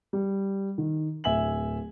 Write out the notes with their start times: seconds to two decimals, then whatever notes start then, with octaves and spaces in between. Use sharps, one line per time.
0.13 G3
0.78 D#3
1.24 D1 E5 G#5 F#7